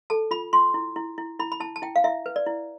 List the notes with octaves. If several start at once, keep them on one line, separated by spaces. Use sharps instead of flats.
A4 A5
F4 B5
F4 C6
E4
E4
E4
E4 B5
B5
E4 A5
A5
E4 G5
F5
E4 E5
B4
D5
E4